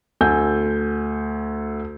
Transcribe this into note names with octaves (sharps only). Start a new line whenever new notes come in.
D2 A4 G#5 G6